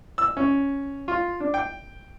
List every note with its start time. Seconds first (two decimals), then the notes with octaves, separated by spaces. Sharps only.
0.18 E6
0.37 C#4
1.08 F4
1.40 D4
1.54 G5